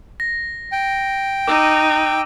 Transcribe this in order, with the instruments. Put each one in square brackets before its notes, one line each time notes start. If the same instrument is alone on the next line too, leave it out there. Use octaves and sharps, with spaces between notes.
[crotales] A#6
[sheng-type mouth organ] G5
[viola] D#4 [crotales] D6 E6 D#7